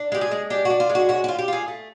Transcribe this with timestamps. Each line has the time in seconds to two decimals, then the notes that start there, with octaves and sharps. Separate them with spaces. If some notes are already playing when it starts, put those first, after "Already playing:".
Already playing: D4
0.12 G#3 G4
0.21 G#4
0.31 G#3
0.50 D4 G4
0.65 D4 F#4
0.80 F4
0.90 G#3
0.95 F#4
1.09 C#4 F#4
1.24 F#4
1.28 F4
1.39 G4
1.48 F4 G#4
1.68 A3